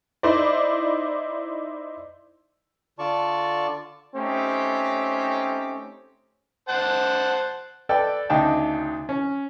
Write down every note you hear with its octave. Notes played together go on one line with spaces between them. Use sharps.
D#4 E4 C5 D5
D3 F4 D5 A5 C#6
A3 C4 C#4 D#4 G4
C5 F#5 A5
A4 B4 D5 G5
D2 C#3 D4 D#4 G5 A5
C#4